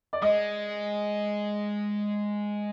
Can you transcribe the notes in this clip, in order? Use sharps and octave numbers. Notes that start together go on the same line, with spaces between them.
D5
G#3 D#5